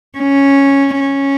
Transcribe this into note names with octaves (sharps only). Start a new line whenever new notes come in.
C#4
C#4